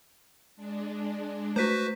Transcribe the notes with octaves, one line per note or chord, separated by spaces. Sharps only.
G#3 D4
A3 F#4 B4 C5 B6